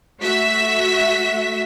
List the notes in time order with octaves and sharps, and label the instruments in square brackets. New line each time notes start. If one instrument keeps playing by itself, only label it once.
[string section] A3 F#4 E5 B6